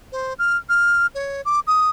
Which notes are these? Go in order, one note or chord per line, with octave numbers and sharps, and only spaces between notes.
C5
F6
F6
C#5
D6
D#6